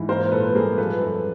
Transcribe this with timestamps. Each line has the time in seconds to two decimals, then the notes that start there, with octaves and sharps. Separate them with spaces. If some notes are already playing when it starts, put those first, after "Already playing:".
Already playing: G#2 E3
0.08 A#3 A#4 C5
0.31 A#2 A4 B4
0.55 G3 G#4 A#4
0.78 F3 A4 B4
1.01 F#2